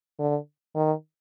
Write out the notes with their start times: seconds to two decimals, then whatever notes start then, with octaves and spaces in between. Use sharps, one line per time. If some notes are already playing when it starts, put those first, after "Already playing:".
0.20 D3
0.76 D#3